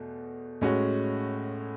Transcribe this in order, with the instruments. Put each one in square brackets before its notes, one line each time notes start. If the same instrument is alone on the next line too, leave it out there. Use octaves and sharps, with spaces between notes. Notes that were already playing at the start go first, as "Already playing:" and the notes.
Already playing: [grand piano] E2 B2 A3
A2 G#3 C#4 F#4